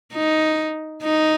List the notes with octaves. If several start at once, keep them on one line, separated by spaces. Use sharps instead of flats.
D#4
D#4